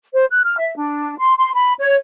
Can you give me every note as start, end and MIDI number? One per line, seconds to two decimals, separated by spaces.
0.13 0.24 72
0.29 0.41 90
0.45 0.56 89
0.58 0.75 76
0.76 1.17 62
1.19 1.33 84
1.36 1.52 84
1.53 1.72 83
1.79 1.96 73